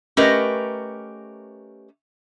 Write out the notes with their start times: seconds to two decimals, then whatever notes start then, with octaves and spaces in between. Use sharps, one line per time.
0.17 A3 C#4 G4 A#4 B4 D#5